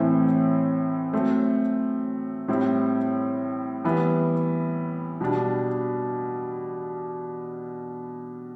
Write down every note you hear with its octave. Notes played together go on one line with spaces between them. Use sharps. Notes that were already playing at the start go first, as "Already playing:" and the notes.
Already playing: A2 E3 A3 C4 E4
F#3 A3 C4
A2 G3 C4 E4
E3 G3 B3 E4
B2 G3 D4